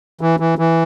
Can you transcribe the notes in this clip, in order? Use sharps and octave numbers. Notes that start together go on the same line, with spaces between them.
E3
E3
E3